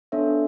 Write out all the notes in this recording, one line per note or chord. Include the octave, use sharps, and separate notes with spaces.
B3 D4 A4 C#5 E5